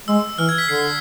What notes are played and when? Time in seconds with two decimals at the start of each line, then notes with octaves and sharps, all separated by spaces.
0.08 G#3 E6
0.38 E3 F6
0.49 G#6
0.58 B6
0.68 D3 C7